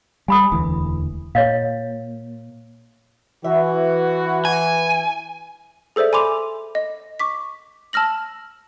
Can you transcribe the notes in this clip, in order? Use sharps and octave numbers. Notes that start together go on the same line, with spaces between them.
G3 G#5 B5 D#6
E1 D2 E3
A#2 C#5 D#5 F5
E3 F#4 E5
G#5
G#4 A4 C5 D5 E5
G#5 B5 C6 D6 F7
D#5
C#6 D6 B6
A5 E6 F6 A#6 F#7